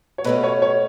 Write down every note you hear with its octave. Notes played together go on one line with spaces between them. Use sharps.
C#5
B2 A3 C#4 B4
C#5
C#5